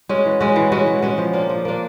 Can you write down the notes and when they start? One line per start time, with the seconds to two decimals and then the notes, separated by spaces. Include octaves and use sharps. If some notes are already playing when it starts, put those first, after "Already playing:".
0.09 G#3 C#4 F#4
0.25 E3
0.40 G#3 C#4 F#4
0.56 E3
0.72 G#3 C#4 F#4
0.87 E3
1.02 G#3 C#4 F#4
1.18 F3
1.33 A#3 D4
1.49 F3
1.65 A#3 D4